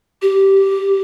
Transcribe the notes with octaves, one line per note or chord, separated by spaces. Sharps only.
G4